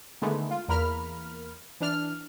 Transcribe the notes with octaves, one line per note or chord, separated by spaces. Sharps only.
D3 D#3 G#3 A3 B3
F4
E2 A#3 A#4 B5 F6
E3 D4 F6